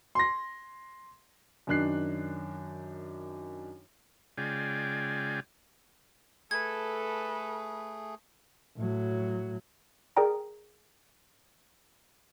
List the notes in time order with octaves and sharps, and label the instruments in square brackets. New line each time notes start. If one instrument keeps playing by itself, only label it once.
[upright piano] C6 A#6
[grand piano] F#2 D#3 D4 F#6 C7
[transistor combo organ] C#3 G#3 F4 D5 G5 G#5
[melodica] A3 G#4 [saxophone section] A4 [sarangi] B4 [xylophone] G#6
[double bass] A2 F#3
[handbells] G#4 A#4 D5 G5 A#5